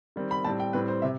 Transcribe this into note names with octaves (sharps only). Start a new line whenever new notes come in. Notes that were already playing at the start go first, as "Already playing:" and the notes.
D#3 G3 C4
B5
A2 G3 C4 A5
G5
A2 G3 C4 B4
C5
C3 E5